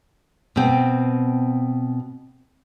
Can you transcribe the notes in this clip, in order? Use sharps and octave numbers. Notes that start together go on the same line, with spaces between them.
B2 C4